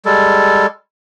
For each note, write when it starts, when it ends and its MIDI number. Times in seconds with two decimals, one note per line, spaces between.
0.05 0.66 55
0.05 0.66 56
0.05 0.66 69